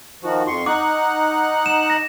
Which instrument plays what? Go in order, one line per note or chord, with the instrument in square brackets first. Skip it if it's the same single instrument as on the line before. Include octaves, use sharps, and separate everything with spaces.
[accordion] D#3 F3 F#4
F2 C6 C#6
[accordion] D#4 F#5 F#6 [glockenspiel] D6
[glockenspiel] E7
A#6